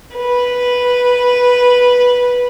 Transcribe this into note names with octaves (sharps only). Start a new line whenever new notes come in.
B4